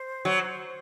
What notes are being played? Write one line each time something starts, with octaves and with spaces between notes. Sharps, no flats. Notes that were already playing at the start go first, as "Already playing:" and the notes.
Already playing: C5
F#3